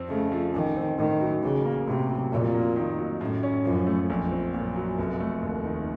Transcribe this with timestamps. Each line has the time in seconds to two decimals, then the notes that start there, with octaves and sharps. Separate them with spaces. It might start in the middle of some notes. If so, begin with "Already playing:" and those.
Already playing: F2 C4
0.09 C#3 A3
0.32 F3
0.54 A1 D#3
0.77 C4
0.98 A2 D#3
1.21 F#3
1.43 A1 C#3
1.65 A#3
1.87 A2 C3
2.10 F#3
2.32 F2 A#2
2.54 A#3
2.76 D#3
2.98 F#3
3.21 F#2 A2
3.43 C#4
3.65 F#2 F3
3.87 A3
4.09 A#1 F2
4.32 C4
4.54 F#2 A#2
4.76 F#3
4.99 F1
5.20 A3
5.42 D#2
5.65 D#3